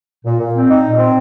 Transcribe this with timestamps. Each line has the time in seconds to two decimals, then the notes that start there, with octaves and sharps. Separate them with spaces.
0.24 A#2
0.39 A#2
0.54 C4
0.69 D#4
0.84 A#2
0.98 C4